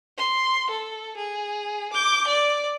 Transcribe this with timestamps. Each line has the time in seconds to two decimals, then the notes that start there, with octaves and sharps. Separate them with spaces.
0.18 C6
0.70 A4
1.17 G#4
1.93 D6 G6
2.27 D5